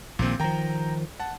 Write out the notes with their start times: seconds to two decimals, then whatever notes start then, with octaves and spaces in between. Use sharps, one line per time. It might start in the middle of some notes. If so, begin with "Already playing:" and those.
0.19 A#1 A#2 D#3 C4
0.40 D#3 F3 G5 A#5
1.20 F#5 A5